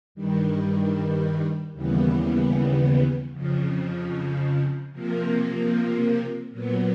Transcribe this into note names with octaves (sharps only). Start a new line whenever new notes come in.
G2 D#3 G3
D#2 C#3 E3 G3 B3
F2 C#3 F3
C3 F3 A#3
A#2 F#3 B3